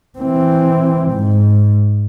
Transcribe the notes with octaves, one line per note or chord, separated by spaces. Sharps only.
E3 C4
G#2